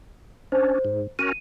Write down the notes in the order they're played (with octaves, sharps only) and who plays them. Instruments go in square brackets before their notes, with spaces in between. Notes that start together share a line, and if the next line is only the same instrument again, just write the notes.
[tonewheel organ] C#4 D4 [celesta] C5
[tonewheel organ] G#2
[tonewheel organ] C#4 F#4 A#4 [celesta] D#7